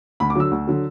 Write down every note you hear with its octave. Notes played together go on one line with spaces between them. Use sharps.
D2 B5
D6
D3 F#3 E6
D2
D3 F#3